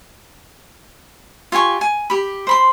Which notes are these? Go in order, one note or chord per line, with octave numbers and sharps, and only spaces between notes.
F4 G4 G#5 C#6
G#5
G4 B5
C5 B5 C6